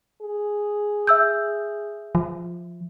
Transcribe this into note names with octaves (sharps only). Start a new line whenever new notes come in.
G#4
E5 E6 G6
F3